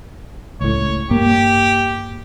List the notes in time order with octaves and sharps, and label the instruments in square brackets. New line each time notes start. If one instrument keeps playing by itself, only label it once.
[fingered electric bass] C#2 A2 [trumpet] C#5
[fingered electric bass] G2 A#3 [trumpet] G4